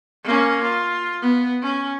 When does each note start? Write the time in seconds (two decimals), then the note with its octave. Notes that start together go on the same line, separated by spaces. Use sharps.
0.24 A#3 C#4
0.63 F4
1.22 B3
1.62 C#4